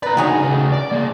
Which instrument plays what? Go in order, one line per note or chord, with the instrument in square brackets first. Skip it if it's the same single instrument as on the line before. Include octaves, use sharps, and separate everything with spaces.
[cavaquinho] B4 [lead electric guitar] D5 A#5
[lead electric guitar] D3 D#4 [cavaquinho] F#4 G#4 C#5
[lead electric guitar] C#3 B4
D5
A#3 G#4